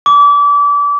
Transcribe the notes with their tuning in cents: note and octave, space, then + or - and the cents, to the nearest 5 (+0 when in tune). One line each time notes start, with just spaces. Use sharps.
D6 -30